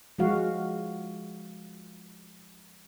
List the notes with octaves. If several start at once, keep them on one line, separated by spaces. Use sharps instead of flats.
F3 G#3 F#4 F5